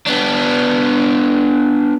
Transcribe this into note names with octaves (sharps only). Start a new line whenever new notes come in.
B3 D4